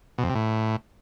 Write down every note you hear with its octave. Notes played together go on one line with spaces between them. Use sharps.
B2
F2
C3
A2